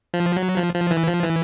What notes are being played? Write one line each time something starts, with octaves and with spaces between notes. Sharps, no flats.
F3
F#3
F3
F3
E3
F3
E3